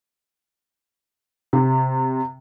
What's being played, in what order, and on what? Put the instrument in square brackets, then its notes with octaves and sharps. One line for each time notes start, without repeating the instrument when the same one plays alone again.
[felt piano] C3